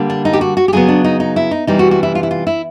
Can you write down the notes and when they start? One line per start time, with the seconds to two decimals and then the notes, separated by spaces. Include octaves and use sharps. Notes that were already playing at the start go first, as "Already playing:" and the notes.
Already playing: D3 G3 A#3
0.10 D4
0.25 D#4
0.33 G4
0.41 F#4
0.57 F#4
0.68 G4
0.73 C#3 F#3 B3 G#4
0.88 D4
1.05 D#4
1.20 D#4
1.36 E4
1.51 D#4
1.67 C3 E3 G3 D#4
1.79 F#4
1.91 F#4
2.03 E4
2.15 F4
2.23 E4
2.31 F4
2.47 E4